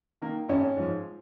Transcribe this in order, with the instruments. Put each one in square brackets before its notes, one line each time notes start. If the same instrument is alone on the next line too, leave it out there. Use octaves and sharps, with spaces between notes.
[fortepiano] D#3 A#3
[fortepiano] G#1 [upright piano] C#4
[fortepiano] G#2 F3